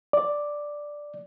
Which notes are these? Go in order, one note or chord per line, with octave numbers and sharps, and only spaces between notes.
D5